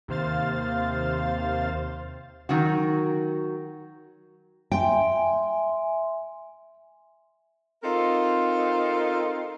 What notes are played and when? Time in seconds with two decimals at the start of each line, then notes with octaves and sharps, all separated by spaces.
0.08 D#2 C3 C5 F5 A6
2.49 D#3 F#3 F#4
4.72 E5 G5 G#5 C6
7.83 C4 D#4 F4 A4 A#4